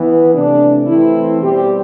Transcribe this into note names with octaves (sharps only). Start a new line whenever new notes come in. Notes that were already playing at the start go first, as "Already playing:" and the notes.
Already playing: E3 B3
C3 E3 A3 D4
E3 A3 C4 E4
B2 G3 C4 G4